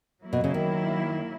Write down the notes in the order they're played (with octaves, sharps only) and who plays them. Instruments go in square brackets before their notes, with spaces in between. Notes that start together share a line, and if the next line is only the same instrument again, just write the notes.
[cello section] F#3 A#3 E4
[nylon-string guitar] B2
C#3
D#3